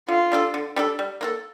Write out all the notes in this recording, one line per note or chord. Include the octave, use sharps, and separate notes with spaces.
D3 F4
G3 D4 A4
D3
G3 D4 A4
G3
A#3 F4 A4